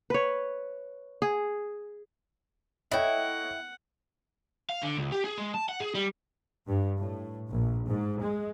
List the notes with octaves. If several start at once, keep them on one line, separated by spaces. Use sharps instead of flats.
B4 C#5
G#4
E4 A4 C#5 D#5 F#5 G5
F5
D3
C#2
G4
G#4
G#3
A5
F#5
G#4
G3
G2
A2
A#1
G#2
G#3